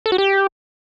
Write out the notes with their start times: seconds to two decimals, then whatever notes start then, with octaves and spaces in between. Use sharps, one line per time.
0.06 A4
0.12 F#4
0.18 G4